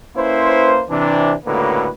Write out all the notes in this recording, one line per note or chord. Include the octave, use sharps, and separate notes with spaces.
A#3 C#4 E4 B4 C5
C3 E3 D4
C#2 A2 D3 A#3 F#4 B4